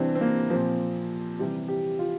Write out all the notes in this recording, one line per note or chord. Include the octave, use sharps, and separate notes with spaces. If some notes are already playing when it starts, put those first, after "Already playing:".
Already playing: C3 E3 G3 C4 D4
C4
A#3
A#2 F3 C4
C3 E3 G3 G4
G4
F4